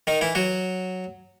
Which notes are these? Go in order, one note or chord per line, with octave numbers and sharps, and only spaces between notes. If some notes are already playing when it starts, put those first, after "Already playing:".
D#3 D#4
E3 E4
F#3 F#4